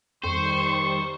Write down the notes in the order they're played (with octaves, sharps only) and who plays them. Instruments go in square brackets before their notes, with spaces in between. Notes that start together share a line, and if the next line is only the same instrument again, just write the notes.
[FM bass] F2 [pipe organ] D#3 G3 [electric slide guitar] C5 [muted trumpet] C#6